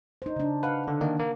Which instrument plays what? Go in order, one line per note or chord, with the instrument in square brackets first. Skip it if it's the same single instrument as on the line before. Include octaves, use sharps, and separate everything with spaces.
[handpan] D#4 C5
C#3 D4
[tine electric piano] B4 [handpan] F5 F#5
[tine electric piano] D3
D#3 A#3 D4
A#3